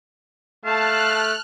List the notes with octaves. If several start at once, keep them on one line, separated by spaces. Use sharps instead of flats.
A3 F5 A5 F6 F#6